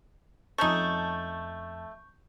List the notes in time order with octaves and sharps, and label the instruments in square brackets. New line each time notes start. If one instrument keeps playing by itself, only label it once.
[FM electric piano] F2 A5 [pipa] A3 C#4 D#4 [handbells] C#6 G6